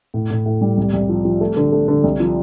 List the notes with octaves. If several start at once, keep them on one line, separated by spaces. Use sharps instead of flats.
A2
A2
A2
G3
C2
C2
F3
F3
A3
D3
A3
D3
C2
F3